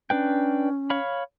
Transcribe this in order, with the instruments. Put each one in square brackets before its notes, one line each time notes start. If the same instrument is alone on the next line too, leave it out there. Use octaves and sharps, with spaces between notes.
[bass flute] C#4 [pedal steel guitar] D4 B4 G5
[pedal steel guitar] C#5 F5 B5